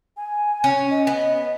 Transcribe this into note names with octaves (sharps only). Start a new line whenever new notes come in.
G#5
C#4
D#5
B3